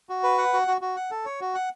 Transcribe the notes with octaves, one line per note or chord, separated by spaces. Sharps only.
F#4
B4
F#5
F#4
F#4
F#4
F#5
A4
C#5
F#4
F#5